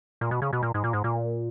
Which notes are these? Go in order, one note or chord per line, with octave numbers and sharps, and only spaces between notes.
A#2
B2
C#3
B2
A#2
G#2
A#2
G#2
A#2